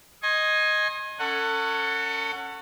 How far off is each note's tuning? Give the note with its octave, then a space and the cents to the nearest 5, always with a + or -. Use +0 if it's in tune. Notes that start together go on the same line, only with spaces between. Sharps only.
D#5 +0 G#5 +0 C6 +40
C#4 +0 A4 +35 F#5 +0